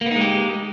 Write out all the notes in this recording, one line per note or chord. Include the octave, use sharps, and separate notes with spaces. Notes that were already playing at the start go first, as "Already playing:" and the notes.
G#3 A#3 B3 D#4 G4